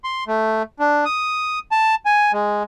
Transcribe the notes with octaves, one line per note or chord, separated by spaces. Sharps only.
C6
A3
D4
D#6
A5
G#5
G#3